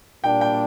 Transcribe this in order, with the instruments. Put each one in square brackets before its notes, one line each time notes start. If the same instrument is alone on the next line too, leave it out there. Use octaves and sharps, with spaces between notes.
[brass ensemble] A#2 G3 A#3 D4 [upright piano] G5
[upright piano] G5